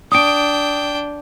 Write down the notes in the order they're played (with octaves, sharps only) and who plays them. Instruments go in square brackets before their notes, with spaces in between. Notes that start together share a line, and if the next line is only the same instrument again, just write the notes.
[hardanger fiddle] D4 G5 [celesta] D#6 D7